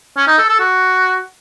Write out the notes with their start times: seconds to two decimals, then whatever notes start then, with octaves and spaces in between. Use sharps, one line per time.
0.17 C#4
0.28 D#4
0.38 A4
0.49 A4
0.59 F#4